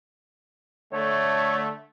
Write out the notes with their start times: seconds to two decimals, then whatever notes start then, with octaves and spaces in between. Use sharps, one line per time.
0.93 D3 A3 C#5